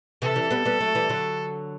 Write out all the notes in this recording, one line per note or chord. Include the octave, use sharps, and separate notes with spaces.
C3 E3 A4
E3 G3
G3 B3
G3 B3
F#3 A3
E3 G3
D3 F#3